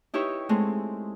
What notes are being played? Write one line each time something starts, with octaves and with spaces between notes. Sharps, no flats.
D#4 E4 G4 B4 C#5 E5
G#3 A3 C4